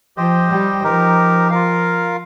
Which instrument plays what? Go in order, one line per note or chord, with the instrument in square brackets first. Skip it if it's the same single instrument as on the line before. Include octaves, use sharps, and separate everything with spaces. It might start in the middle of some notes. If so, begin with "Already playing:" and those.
[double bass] F3 [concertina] G4 C5 D#5 G5
[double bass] G3
[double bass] F3 [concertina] D#4 G4 A#4
[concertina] F4 A#4 F5